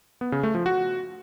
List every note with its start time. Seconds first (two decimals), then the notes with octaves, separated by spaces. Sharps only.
0.21 B3
0.32 C#3
0.43 A3
0.55 F3
0.66 F#4